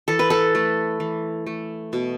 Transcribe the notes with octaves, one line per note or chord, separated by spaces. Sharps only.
E3 A4
B4
A4
A3
E3
A3
B2